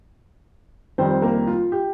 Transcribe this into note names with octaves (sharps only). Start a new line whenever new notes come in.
F2 D#3 G3 C4 C5
A#3 A#4
F4
G4